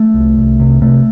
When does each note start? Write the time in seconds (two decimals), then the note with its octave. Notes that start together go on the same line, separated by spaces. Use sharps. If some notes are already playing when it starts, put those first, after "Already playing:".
Already playing: A3
0.14 C2
0.37 C2
0.60 C3
0.82 C3 A3